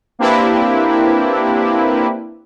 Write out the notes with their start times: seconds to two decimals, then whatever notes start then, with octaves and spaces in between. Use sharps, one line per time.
0.19 A#3 C4 D4 E4 G4 B4